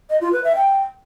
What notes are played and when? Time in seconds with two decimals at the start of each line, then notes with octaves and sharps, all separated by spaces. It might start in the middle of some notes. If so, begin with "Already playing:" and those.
0.10 D#5
0.21 F4
0.33 B4
0.44 E5
0.55 G5